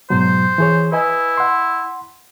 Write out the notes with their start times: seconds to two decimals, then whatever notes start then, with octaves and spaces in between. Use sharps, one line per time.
0.10 G#2 B2 F#3 C5
0.58 E3 G#4 C#5
0.92 E4 B4 D#5 G#5
1.37 F#5 C6